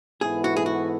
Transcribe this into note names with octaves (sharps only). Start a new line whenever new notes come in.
G#2 E3 B3 E4 G#4 A4
F#4
G#4
F#4